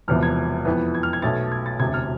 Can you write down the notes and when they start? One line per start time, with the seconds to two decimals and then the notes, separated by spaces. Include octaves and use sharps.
0.08 E1 E2 C3 F3 B3 F6
0.23 G#6
0.65 F2 E3 B3
0.95 G#6
1.03 F6
1.13 G#6
1.22 B1 B2 A3 A6
1.52 G#6
1.66 A6
1.79 E1 D2 C3 G#6
1.94 F6